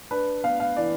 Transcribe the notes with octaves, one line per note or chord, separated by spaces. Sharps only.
D4 B4
B3 F5
F5
E3 D5